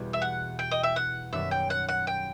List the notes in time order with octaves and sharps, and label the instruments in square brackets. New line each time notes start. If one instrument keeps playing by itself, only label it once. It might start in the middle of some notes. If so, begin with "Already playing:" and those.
Already playing: [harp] E2 B2 G3 B3 F#4
[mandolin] E5
F#5
G5
D#5
E5
F#5
[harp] F#2 D#3 G3 B3 F#4 [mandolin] E5
[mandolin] G5
F#5
F#5
G5